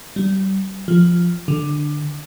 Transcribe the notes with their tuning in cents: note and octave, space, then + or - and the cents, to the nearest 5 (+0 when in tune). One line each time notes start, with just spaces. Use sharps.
G3 -25
F3 +0
D3 +10